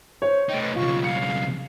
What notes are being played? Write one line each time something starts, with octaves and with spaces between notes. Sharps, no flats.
C5 C#5
A3 D#4 G5
B4
B1 C#3 F4 C#6
F5 C#7